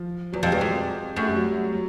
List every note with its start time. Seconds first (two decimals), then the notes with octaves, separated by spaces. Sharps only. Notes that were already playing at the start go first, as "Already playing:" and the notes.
Already playing: F3
0.32 E2 F#3
0.43 F2 G3
0.52 E2 G#3
0.61 F2
1.17 F#2 A3
1.26 G3
1.36 F#3
1.73 F#3